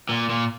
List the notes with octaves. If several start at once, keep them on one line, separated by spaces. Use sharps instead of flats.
A#2
A#2